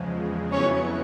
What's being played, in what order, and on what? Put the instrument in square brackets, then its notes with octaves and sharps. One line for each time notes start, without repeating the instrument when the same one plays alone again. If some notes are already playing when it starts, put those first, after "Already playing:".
Already playing: [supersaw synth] E2 C#3 F3 G#3
[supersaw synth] F2 C#3 F#3 B3 E4 [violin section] C#4 C#5